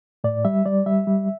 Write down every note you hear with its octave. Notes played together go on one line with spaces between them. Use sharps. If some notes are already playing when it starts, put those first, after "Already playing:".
A2 D5
G3 E5
G3 D5
G3 E5
G3